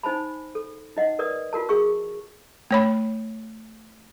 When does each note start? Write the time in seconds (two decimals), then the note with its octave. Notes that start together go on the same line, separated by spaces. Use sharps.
0.03 D#4 C5 G#5 A5 B5
0.55 A4
0.97 D#4 D#5 F#5
1.19 A#4 B4 D5 D#6
1.53 F4 F#4 A#4 A5
1.69 G#4 G5 C#6 E6
2.71 A3 C#5 B5